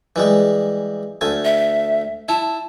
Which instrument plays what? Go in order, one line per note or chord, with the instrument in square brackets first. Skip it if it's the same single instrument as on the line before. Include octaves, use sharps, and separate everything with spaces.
[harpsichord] E3 G3 G#3
D2 A3 G#5
[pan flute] E5
[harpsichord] E4 [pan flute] A5